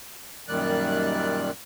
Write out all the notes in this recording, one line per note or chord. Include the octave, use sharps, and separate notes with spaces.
F#2 A#2 D#3 G3 D5 F#6